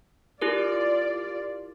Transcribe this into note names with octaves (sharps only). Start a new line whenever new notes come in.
E4 F4 G4 A#4 D5